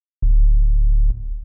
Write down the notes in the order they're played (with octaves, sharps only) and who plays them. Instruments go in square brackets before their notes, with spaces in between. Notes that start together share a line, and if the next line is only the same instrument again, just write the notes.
[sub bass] D1